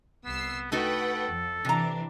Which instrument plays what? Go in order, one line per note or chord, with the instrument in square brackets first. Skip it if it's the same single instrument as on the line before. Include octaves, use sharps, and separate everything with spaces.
[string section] C2 E6 C7 [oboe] B3
[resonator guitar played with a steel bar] A3 D#4 F#4 [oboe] A4 [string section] B4 F#5 G5
[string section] F2
[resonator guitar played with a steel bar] C3 A#5 [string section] E3 D4